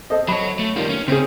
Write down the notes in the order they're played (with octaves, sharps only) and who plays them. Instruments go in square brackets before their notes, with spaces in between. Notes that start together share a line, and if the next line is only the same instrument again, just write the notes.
[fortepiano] A4 C5 D#5
[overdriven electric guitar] F#3 C#5 [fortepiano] B5
[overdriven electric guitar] A3
[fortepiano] D#3 [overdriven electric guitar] G3 F4
[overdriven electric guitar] C#4
[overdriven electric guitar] C#3 C#4 [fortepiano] C4 G#4